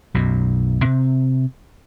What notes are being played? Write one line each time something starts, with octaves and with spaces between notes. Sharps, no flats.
B1 F#2 B2
C3 C4